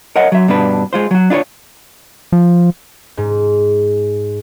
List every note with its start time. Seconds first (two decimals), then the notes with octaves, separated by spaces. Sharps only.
0.16 A#4 C#5 D#5 F#5
0.32 F#3 E5
0.48 G2 B2 D4 B4
0.93 G#3 F4 C5
1.11 F#3 F#4
1.30 D4 F4 A#4 C#5
2.32 F3
3.17 G#2